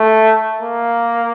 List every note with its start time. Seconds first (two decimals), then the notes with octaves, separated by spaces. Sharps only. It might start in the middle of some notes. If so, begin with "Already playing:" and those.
Already playing: A3
0.60 A#3